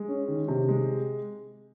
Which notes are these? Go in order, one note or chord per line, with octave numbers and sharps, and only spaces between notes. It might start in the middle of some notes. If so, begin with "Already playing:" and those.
Already playing: G#3
C#4
D#3
C3
G#3